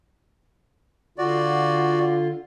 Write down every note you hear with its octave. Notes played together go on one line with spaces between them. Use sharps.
D3 F4 F#4 D5